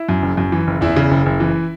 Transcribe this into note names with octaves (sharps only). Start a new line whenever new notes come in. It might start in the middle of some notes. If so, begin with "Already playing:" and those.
Already playing: E4 E5
F#2
F#1
F#2
E3
F#1
E2 E4 E5
C#3
F#1
F#1
E3